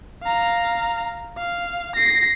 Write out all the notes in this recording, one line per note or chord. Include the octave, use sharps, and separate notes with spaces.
F5 A#5
F5
A#6 C7